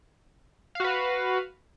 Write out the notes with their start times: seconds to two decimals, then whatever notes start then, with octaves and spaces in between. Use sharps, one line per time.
0.75 F5
0.80 F#4
0.84 B4